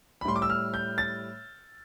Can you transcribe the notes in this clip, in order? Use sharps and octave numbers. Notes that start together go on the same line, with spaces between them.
B5
A2 G3 C6
D6
E6
F6
G6
A6